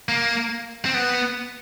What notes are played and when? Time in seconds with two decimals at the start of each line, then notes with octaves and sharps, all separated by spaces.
0.09 A#3
0.85 C4
0.94 B3